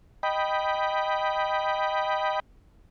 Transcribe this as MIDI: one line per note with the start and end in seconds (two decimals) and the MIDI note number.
0.23 2.40 75
0.23 2.40 79
0.23 2.40 83